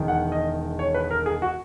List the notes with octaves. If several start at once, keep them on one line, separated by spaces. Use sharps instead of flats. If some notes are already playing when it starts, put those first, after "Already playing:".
Already playing: E1 E2 D#3
F#5
D#5
C#5
B4
A#4
G#4
F#4